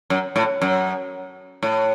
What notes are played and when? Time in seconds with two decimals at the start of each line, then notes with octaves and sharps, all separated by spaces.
0.10 F#2
0.36 A2
0.62 F#2
1.63 A2